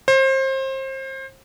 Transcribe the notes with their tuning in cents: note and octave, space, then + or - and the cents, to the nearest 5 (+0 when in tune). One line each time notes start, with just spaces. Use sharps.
C5 +30